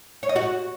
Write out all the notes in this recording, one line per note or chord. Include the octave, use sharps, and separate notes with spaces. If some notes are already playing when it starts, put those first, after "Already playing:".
C#5
D#5
F#4